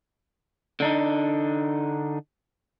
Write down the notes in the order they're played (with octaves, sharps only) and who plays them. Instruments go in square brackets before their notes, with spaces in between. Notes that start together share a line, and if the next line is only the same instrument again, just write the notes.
[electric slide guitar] D3 D4 D#4